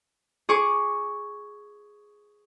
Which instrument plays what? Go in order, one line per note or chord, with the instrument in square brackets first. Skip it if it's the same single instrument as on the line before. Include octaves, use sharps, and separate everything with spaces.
[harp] G#4 C#6 D6